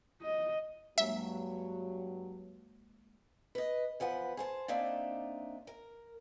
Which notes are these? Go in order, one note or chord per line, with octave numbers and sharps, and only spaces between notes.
D#5
G2 F#3 G#3 A#3 E5
B4 D#5
E2 F3 B4 F#5
G#4 C5 A5
A#3 C4 D4 D#4 E5 A5
A#4